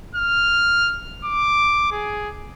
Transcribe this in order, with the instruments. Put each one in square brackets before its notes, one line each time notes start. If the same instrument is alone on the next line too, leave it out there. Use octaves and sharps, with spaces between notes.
[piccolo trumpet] F6
D6
G#4